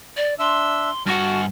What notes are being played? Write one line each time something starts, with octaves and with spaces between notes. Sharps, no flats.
D5
D4 E5 C6 E6
G2 F#4 F#5 A5 F6